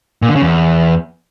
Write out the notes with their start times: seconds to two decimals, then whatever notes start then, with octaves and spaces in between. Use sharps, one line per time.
0.22 A#2
0.29 D3
0.35 C#3
0.42 E2